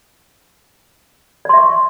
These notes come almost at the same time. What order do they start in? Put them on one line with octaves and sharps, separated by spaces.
D5 C6 E5 C#6